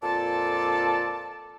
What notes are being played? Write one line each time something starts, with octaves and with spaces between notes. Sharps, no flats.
F2 A#2 F4 A4 D5 A5